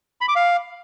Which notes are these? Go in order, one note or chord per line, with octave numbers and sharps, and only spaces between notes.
B5
D6
F5